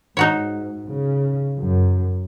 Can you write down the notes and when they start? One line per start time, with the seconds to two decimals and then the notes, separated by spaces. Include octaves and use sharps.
0.17 G#2 D#4 F#4 C#5
0.88 C#3
1.58 F#2